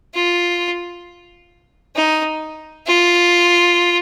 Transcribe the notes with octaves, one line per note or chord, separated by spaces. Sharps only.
F4
D#4
F4